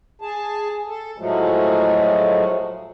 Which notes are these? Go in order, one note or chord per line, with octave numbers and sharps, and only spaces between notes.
G#4 A5
A4
A2 F3 F#3 G#3 A3